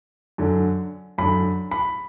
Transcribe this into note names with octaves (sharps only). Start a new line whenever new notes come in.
F#2 D3
F#2 D3 B5
B5